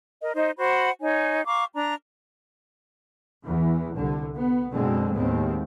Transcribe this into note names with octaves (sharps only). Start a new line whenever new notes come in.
A#4 D#5
D#4 C5 D#5
F#4 C5 F#5 B5
D#4 C#5 G#5
F5 A#5 C#6 D6
D4 A#5
E2 E3
C2 D3
B3
F#2 B2 D3 G#3 C4
D#2 A2 G#3 B3 C4